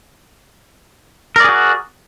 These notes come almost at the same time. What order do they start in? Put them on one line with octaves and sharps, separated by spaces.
A#4 D5 G#4 F#4